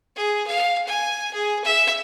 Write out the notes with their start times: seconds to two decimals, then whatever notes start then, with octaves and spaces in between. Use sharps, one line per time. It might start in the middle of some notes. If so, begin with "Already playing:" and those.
0.16 G#4
0.47 F5
0.87 G#5
1.33 G#4
1.64 E5